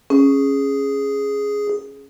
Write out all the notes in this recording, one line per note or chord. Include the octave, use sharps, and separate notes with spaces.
C#4 G#4